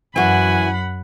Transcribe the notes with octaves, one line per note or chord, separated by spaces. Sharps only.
F#2 E3 F#4 F#5 G#5 B5